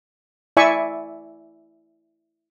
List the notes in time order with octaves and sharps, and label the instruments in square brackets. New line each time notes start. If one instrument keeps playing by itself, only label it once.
[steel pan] E4 D5 E5 G#5 C#6